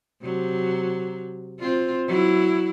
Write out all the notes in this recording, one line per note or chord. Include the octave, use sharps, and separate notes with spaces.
C3 F#3
C4 F4
F#3 E4